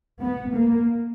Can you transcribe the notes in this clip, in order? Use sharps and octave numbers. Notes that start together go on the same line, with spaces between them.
B3
A#3